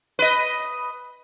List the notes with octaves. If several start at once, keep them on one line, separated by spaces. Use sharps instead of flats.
B4 D#5